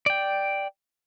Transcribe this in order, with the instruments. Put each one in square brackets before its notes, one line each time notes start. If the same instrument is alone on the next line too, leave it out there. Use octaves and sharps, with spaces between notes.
[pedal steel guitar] D5 G5